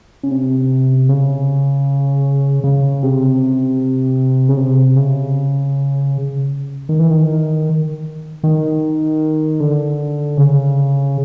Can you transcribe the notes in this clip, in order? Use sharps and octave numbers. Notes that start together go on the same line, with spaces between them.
C#3
C3
C#3
C#3
C3
C#3
C3
C#3
D#3
E3
D#3
D#3
D3
C#3